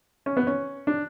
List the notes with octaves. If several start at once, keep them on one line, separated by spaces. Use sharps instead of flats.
C#4
B3
C#4
D4